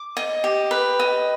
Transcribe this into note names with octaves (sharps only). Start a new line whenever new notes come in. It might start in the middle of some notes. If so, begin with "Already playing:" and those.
Already playing: D6
D#5
G4
B4
D#5